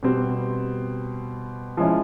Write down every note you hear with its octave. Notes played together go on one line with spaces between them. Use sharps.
B2 G3 C4
F3 G#3 C#4 E4